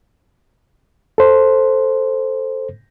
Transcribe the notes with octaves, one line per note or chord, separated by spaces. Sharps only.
A4 C5